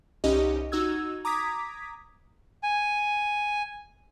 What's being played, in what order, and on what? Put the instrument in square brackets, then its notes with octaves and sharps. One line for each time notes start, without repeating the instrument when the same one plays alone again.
[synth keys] C2 C#4 D#4 G4 D#5
D#4 F#4 E6 G#6
A#5 D6 D#6 G#6 B6
[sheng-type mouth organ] G#5